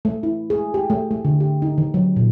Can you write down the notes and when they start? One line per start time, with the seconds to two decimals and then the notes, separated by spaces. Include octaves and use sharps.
0.05 A3
0.23 E4
0.50 G#4
0.74 G4
0.90 A3
1.11 A3
1.25 D3
1.40 G4
1.62 D#4
1.78 D#3
1.94 F#3
2.16 A#2